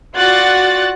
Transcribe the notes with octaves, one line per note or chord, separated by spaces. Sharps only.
F4 F#4 D5 F#5 F#6 A6